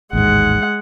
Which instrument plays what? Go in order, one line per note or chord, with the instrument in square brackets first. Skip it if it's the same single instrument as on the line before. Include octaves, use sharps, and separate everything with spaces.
[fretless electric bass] A1 D#2 G#2 [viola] G#3 F#5